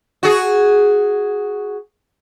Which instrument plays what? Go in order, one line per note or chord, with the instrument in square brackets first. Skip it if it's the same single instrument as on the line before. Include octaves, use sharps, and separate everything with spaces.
[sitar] F#4 G#4